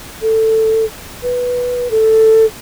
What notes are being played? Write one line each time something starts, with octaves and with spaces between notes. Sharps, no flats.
A4
B4
A4